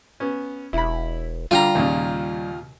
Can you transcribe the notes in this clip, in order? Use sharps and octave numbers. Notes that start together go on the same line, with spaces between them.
B3 C#4
E1 E4 B5
D3 G3 F4 G5 A#5
D#2 A#2 C#3